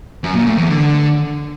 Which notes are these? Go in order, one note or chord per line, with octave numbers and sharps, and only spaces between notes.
F#2
A#2
A2
E2
D3